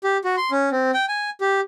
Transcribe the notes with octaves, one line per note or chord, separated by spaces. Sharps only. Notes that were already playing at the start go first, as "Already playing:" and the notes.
G4
F#4
C6
C#4
C4
G5
G#5
G4